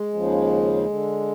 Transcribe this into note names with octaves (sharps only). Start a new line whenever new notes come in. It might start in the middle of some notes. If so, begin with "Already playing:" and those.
Already playing: G#3
D#2 C#3 F3
D3